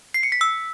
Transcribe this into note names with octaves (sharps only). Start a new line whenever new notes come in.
C7
C#7
B6
E6